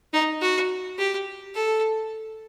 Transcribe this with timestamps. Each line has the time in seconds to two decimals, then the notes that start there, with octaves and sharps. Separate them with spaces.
0.14 D#4
0.41 F#4
0.98 G4
1.55 A4